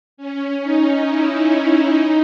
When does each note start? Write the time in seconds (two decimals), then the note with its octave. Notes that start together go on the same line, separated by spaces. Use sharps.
0.17 C#4
0.62 D#4
1.05 E4
1.49 E4
1.93 D#4